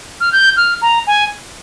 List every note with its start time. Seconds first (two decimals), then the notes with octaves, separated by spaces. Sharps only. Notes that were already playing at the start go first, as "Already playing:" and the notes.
0.21 F6
0.32 G6
0.57 F6
0.82 A#5
1.07 G#5